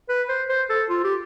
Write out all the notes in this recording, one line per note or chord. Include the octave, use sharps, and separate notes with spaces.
B4
C5
C5
A4
F4
G4